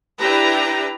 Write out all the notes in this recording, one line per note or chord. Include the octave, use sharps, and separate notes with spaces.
D4 E4 G4 B4 A#5